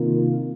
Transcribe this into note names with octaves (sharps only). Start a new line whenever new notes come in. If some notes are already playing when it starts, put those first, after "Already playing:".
Already playing: C3 D#3 A#3 F4